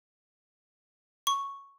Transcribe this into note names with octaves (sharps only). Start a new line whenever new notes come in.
C#6